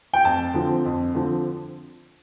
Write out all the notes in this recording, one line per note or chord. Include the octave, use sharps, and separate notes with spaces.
G5
F2 A5
D3 F3 C4
F2
D3 F3 C4